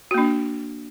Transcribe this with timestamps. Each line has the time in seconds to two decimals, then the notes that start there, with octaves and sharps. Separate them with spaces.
0.11 F#4
0.14 A#3
0.18 D4